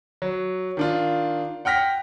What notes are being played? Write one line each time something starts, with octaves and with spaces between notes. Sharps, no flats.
F#3
D#3 D4 F4
F#5 G5 F6 A#6 B6